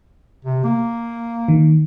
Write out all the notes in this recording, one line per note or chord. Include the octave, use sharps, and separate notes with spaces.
C3
A#3
D#3